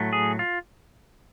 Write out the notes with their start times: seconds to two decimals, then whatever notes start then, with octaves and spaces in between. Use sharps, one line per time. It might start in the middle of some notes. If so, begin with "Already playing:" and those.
Already playing: A2 F#3 A3
0.13 G#4
0.39 F4